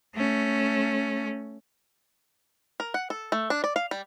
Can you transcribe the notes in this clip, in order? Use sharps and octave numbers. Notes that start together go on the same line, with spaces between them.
A3 C#4
A#4
F#5
A4
A3
D4
D5
F5
G3